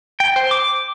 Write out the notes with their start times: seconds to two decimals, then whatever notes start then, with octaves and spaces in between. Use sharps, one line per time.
0.20 G5
0.36 C5
0.51 D6